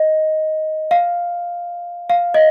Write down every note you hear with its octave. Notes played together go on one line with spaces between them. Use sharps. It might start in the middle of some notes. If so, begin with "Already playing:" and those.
Already playing: D#5
F5
F5
D#5